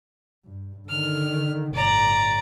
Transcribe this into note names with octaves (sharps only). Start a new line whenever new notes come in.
G2
D3 D#3 F6
G1 A2 D5 A#5